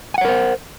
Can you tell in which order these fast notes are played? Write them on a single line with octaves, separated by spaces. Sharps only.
G#5 F#5 C#5 A#4 C5